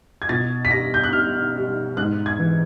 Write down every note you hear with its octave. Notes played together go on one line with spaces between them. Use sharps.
G#6
B2 A6
B6
G3 A#6
G6
F#6
G3 F6
G3
G#2 F#6
G#6
E3